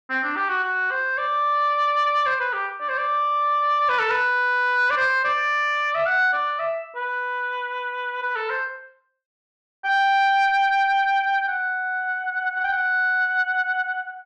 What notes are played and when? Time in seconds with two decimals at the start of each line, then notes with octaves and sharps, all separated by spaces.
0.10 C4
0.23 D4
0.36 G4
0.49 F#4
0.64 F#4
0.91 C5
1.18 D5
2.26 C5
2.40 B4
2.53 G4
2.80 D5
2.89 C5
2.98 D5
3.89 B4
3.99 A4
4.11 B4
4.90 D5
4.97 C5
5.24 D5
5.95 E5
6.06 F#5
6.33 D5
6.59 E5
6.96 B4
8.23 B4
8.36 A4
8.50 C5
9.85 G5
11.48 F#5
12.57 F#5
12.64 G5
12.72 F#5